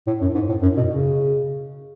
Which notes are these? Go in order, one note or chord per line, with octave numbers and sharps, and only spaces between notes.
A2
F#2
G#2
A2
F#2
B2
C#3